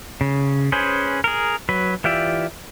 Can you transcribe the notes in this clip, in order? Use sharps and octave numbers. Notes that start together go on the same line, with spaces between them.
C#3
C#4 G#4 B4 C5
G#4 A#4
F#3 B4
E3 F4 G4 D5 E5